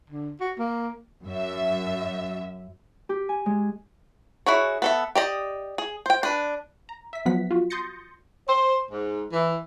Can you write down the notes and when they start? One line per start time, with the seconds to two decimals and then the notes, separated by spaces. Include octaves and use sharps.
0.10 D3
0.40 F#4
0.59 A#3
1.25 F#2 E5
3.09 G4
3.29 G#5
3.46 G#3
4.46 E4 F#4 G#4 C#5
4.82 B3 A4 E5
5.15 G4 D5 D#5
5.78 G#4
6.06 C5 G5
6.23 D4 B4
6.89 A#5
7.13 E5 B6
7.26 F3 F#3 B3 F#5 B6
7.51 F4 F#4
7.70 C6 D#6 G6 A6 A#6 C#7
8.48 C5
8.91 G#2
9.32 E3